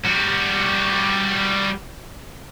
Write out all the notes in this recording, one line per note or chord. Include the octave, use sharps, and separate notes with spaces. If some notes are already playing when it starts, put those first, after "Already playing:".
G3 F#4